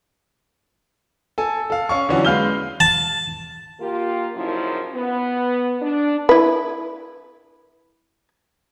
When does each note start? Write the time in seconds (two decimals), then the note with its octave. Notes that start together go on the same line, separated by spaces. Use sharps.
1.38 A4 G#5
1.70 A4 F5
1.89 C#4 F5 C#6
2.09 D3 E3 F#3 C#4 D4 F#4
2.25 G#3 B4 F5 F6 G6 G7
2.80 A5
3.80 A#3 F4 G4
4.35 F#2 A#2 C#3 F3 D#4 E4
4.94 B3
5.81 D4
6.29 E4 B4